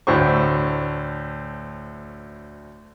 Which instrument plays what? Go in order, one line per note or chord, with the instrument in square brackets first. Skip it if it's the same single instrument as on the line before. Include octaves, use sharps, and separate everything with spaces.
[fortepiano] D2 A2 C5 C#6